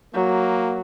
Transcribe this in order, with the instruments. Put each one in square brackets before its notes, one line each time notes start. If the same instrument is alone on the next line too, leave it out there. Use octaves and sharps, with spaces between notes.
[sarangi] F#3 [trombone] A#3